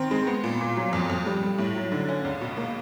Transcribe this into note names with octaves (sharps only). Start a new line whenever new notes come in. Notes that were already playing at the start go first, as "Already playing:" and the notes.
Already playing: D#3 C4
G#3
B3
A#2
A#2
F#3
F2
F2
G3
G3
A2
F#3
D3
C#4
C#2
B2
A#3